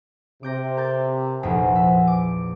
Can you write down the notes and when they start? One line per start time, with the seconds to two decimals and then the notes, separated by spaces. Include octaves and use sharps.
0.43 C3 D6 G6 A#6
0.77 A#4 G6 A6
1.43 F1 A#1 E2 C5 F#5 G#5
1.76 E5
2.07 D6